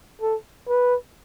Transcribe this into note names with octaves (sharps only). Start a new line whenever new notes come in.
A4
B4